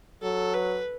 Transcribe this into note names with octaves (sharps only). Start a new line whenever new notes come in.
F#3 A4
B4